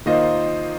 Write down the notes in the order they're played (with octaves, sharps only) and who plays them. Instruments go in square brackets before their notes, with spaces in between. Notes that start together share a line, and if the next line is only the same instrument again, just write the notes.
[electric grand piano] D#3 A#3 F4 C5 [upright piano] D#5